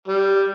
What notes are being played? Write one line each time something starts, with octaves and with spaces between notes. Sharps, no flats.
G3